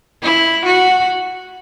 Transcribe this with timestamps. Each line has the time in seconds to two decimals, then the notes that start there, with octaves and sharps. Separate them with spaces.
0.22 E4
0.65 F#4